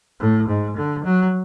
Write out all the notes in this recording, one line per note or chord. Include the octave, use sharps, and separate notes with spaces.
A2
G#2
D3
F#3